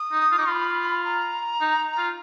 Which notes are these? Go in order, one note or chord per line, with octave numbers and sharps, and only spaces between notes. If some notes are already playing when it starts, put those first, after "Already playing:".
Already playing: D#6
D#4
F4
D#4
F4 B5
A#5
D#4
F4